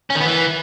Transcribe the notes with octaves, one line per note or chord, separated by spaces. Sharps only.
C#4
D#3
B3
E3